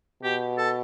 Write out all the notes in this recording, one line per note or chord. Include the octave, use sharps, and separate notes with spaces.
B2 G4
A4